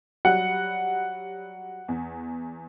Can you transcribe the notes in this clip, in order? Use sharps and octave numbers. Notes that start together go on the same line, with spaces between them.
F#3 G3 F#5
E2